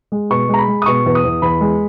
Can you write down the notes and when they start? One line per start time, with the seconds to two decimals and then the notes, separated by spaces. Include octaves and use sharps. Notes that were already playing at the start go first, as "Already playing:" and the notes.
0.12 G#3
0.30 B2 C#6
0.49 G#3 A#5
0.59 B5
0.68 G#3
0.82 D#6
0.86 B2 C#6
1.06 E2
1.15 D#6
1.24 E2
1.42 E2 B5
1.61 G#3